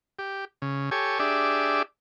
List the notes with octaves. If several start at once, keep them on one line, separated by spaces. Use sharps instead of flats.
G4
C#3
G4 A4 C#5 G#5
D4 G4 G#4 D5 E5